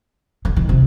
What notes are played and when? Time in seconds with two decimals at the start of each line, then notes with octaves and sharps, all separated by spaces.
0.45 D3
0.56 D#3
0.69 C3